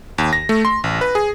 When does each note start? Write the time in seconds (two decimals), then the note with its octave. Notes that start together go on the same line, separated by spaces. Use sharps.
0.18 D#2
0.33 A#6
0.49 A3
0.65 C6
0.84 A1
1.01 B4
1.15 G#4